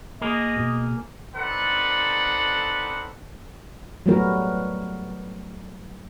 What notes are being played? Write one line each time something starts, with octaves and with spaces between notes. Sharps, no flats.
A#3 G#4 A#4 D#5
B2
C4 D#4 A4 B4 D5 F#5
F#3 G3 A3 B3 F#4 A#4